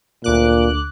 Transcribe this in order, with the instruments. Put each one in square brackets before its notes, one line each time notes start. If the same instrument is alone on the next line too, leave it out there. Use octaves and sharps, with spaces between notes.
[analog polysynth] D2 D6 F#6 [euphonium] A#2